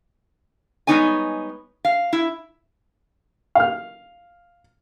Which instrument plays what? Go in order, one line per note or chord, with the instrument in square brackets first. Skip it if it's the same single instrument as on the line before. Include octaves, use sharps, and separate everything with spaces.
[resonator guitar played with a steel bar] G3 G#3 B3 D#4 C#5 G#5
F5
E4
[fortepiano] F5 F6